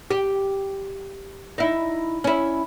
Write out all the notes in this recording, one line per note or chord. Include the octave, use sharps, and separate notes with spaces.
G4
D#4 E4
C#4 E4